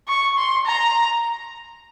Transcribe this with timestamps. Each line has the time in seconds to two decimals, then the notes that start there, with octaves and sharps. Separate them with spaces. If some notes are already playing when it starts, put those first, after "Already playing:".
0.08 C#6
0.37 C6
0.65 A#5